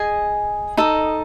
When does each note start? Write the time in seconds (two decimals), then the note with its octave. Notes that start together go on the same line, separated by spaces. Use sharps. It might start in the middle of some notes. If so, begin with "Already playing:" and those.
Already playing: G#4 D#5 G#5
0.77 D#4 A4 D#5